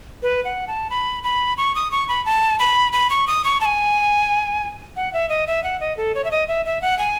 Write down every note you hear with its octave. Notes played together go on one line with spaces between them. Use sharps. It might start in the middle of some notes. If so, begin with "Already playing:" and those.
B4
F#5
A5
B5
B5
C#6
D#6
C#6
B5
A5
B5
B5
C#6
D#6
C#6
A5
G#5
F#5
E5
D#5
E5
F#5
D#5
A4
C#5
E5
D#5
E5
E5
F#5
G#5